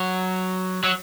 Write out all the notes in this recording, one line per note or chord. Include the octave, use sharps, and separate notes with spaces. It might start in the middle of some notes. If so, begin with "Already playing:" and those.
Already playing: F#3
F#3